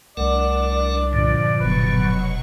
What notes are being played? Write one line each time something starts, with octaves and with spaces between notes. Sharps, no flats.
C2 A3 D4 A#4 D5 F#5
G2 A#2 D3 F3
F1 B2 F#3 B4 C#6